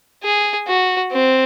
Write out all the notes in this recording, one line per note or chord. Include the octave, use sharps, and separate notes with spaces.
G#4
F#4
C4